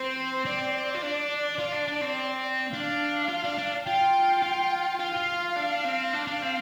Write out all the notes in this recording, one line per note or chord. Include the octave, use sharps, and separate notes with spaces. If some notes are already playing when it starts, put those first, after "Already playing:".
Already playing: C4 C5
C4 D5
F4
D4
F4
D4
D4
C4
D4 F5
F4
D4
D4
F4 G5
F4
F4 F5
F4
D4
C4
D4 F5
D4
C4